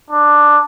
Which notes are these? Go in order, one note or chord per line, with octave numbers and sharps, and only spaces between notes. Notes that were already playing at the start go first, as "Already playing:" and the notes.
D4